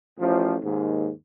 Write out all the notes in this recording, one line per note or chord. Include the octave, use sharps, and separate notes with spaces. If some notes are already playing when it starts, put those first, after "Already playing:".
A1 F3
D#2 G#2